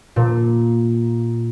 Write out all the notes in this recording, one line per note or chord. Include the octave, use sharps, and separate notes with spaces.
A#2